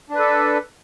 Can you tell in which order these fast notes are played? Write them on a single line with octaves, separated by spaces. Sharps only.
D4 B4 A4